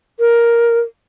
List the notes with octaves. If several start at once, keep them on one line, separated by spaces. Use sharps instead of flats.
A#4